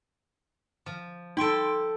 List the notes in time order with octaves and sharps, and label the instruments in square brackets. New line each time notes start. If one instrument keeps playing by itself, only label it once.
[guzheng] F3
[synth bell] D#4 C6 D7 [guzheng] A4 G5